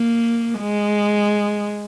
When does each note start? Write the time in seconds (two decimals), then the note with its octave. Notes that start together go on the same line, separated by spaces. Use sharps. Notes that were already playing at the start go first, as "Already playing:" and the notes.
Already playing: A#3
0.60 G#3